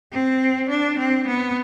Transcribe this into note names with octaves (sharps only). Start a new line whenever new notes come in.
C4
D4
C4
B3